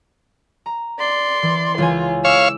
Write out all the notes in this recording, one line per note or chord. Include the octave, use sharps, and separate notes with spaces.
A#5
D5 C6
E3
C#2 E3 F4 G#5
C#5 F5 D6 E6